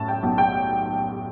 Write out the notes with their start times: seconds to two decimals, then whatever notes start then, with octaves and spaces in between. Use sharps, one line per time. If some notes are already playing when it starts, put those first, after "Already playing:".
Already playing: F#2 A2 A5
0.08 G5
0.23 B1
0.38 G5